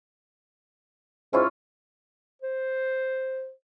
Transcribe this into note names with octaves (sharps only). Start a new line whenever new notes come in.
G#2 C#4 E4 F4
C5